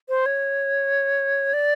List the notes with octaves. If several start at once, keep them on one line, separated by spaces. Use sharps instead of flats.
C5
C#5
D5